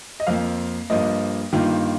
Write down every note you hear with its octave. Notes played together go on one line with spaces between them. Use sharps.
D#5
F2 F3 A#3 F5
G2 F3 A#3 D#5
G2 D#3 A#3 F4